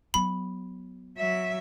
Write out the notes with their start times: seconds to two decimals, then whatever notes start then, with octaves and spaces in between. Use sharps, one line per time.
0.14 F#3 B3 B5
1.17 F#3 E5